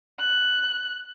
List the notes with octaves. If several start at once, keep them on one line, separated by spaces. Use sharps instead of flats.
F#6